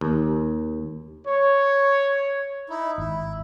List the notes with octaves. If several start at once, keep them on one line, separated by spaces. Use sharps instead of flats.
D#2
C#5
D#4 E4
G#1 E4